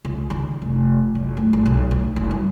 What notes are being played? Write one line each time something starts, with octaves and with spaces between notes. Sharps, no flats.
C#2
D#3
F1
F#1
A3
G#1
B1
D2
F#1
G2